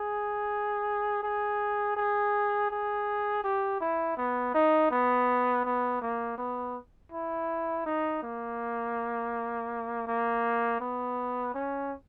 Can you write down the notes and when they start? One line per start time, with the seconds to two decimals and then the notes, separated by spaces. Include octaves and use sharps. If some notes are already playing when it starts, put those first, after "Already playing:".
Already playing: G#4
1.23 G#4
1.96 G#4
2.70 G#4
3.44 G4
3.81 E4
4.17 B3
4.54 D#4
4.91 B3
5.65 B3
6.01 A#3
6.38 B3
7.12 E4
7.86 D#4
8.23 A#3
10.07 A#3
10.80 B3
11.54 C#4